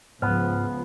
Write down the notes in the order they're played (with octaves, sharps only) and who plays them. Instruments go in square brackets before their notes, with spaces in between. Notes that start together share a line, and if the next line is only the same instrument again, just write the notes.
[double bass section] C#2 F3 [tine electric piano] G#2 F6 [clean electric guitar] B3